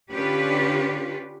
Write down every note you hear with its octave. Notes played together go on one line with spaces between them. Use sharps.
D3 C#4 D4 F4 G4 B4